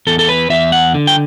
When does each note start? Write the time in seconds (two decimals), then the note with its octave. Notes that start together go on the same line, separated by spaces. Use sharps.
0.07 E2 A4
0.19 A4
0.29 B4
0.50 E2 E5
0.72 F#5
0.94 D3
1.07 G5